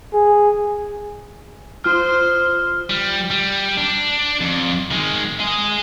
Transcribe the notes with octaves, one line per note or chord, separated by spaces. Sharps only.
G#4
F4 C5 D#6 F6 G6
G3
G3
D4
F2
D#3 G#3
G#4 D#5